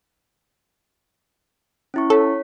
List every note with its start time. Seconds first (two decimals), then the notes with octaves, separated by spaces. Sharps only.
1.94 C#4 E4 C#6
2.10 A4 C#5 B6